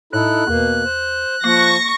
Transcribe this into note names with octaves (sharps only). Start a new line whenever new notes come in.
A2 D#4 E4 A4 F#6
E2 B2 A#3
C5
F3 A#3 C#6 A#6